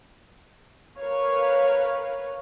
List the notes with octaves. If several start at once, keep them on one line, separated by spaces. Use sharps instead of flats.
A#4 B4 C#5 F5